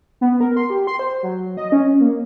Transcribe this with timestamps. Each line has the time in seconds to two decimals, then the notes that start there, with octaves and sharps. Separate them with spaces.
0.21 B3
0.41 A#4
0.57 C6
0.70 G4
0.87 C6
0.99 C5
1.23 F#3
1.57 D#5
1.72 C#4
2.01 A#3